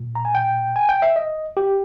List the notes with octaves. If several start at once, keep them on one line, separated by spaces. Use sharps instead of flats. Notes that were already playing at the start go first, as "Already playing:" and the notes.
Already playing: A#2
A#5
G#5
G5
G#5
G5
E5
D#5
G4